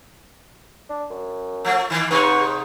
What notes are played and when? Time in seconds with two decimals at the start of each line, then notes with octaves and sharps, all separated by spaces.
0.90 D4
1.10 F#2
1.65 F3 A3
1.90 D#3 E3 A#3
2.11 G#2 C3 D#4 B4 C#6